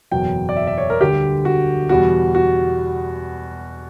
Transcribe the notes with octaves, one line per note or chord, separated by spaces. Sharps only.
F#1 E2 B2 F#3 G5
D5
E5
E5
C#5
A#4
D2 D3 G3 G4
F#4
E2 B2 G3 F#4
F#4